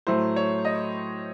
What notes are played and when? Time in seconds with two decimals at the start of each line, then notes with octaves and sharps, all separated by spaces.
0.07 A2 F#3 A3 C5
0.36 C#5
0.65 D#5